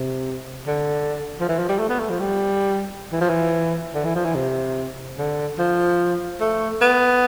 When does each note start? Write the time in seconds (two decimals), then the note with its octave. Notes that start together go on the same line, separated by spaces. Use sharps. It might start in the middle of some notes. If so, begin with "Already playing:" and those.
Already playing: C3
0.67 D3
1.40 F3
1.48 E3
1.59 F3
1.69 G3
1.79 A3
1.89 B3
1.99 A3
2.10 F3
2.20 G3
3.12 E3
3.21 F3
3.30 E3
3.94 D3
4.04 E3
4.15 F3
4.25 E3
4.35 C3
5.18 D3
5.58 F3
6.40 A3
6.81 B3